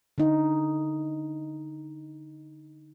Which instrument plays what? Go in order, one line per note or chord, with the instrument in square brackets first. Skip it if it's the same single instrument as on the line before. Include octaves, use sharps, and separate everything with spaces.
[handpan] D3 D#4